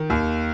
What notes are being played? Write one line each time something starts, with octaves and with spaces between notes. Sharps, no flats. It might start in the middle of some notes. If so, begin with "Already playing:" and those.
Already playing: D#3
D#2